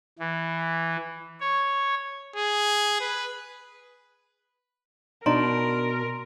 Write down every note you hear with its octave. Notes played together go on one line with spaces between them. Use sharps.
E3
C#5
G#4
B4
B2 D4 D#4 A#4 A#5 C6 D7